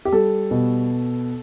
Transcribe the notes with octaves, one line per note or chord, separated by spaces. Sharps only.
G4
G3 A4
B2